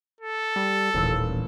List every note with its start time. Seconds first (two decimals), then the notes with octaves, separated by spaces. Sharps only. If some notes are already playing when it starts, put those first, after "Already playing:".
0.20 A4
0.56 G3
0.94 D#1 A1 A#2 E6